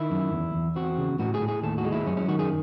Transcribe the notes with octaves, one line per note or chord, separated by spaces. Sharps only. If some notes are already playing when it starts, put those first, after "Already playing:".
Already playing: D#3 E4
F#2
E2
E2
C4 F#4
C#3
A2 F#4
G#4
A2
G#4
D#2 A4
F#4
G#3
E4
F#2 C#4
C#4
D#3 F#4
G#4